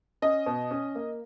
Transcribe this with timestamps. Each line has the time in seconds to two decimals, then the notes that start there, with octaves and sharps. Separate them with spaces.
0.22 C#4 D#5
0.46 B2
0.71 C#4
0.95 A#3